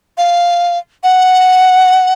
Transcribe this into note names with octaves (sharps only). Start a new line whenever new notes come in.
F5
F#5